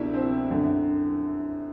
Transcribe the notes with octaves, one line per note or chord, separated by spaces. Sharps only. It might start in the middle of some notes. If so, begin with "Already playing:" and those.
Already playing: C2 B2 D4 E4
C4
F#2 D3